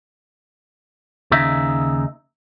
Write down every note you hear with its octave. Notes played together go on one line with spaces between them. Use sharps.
D#2 C#3 D#4 E5